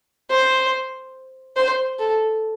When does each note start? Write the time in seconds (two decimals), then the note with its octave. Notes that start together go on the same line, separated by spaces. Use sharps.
0.30 C5
1.56 C5
1.99 A4